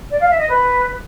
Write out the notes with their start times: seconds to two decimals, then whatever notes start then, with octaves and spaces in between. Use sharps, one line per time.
0.11 D5
0.20 F5
0.29 E5
0.39 D#5
0.48 B4